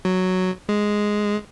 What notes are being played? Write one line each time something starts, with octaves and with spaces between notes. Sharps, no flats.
F#3
G#3